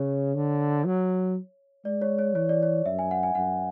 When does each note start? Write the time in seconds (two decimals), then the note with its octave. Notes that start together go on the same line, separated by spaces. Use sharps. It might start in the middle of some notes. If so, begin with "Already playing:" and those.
Already playing: C#3 C#5
0.35 D3
0.85 F#3
1.85 G#3 D5
2.02 C#5
2.19 C#5
2.35 E3 C#5
2.49 D5
2.63 C#5
2.86 F#2 E5
2.99 G#5
3.11 F#5
3.23 G#5
3.35 F#2 F#5